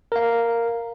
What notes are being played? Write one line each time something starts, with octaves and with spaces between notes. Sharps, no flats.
A#4 F5